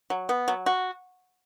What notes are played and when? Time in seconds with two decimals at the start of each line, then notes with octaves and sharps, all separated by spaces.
0.10 F#3
0.29 B3
0.48 F#3
0.66 F#4